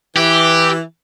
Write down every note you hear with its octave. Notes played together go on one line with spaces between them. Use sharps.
E3 G4